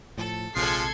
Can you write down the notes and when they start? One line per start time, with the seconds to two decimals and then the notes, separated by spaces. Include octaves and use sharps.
0.18 A2 F3 A4
0.56 A#1 C3 F3 G#3 A4 G#6 C7